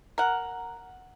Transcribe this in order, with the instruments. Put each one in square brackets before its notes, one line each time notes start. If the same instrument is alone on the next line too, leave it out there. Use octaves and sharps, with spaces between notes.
[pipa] A#4 F#5